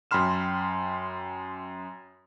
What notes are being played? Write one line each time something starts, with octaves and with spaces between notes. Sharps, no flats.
F#2 G5 B5 C6 F6 E7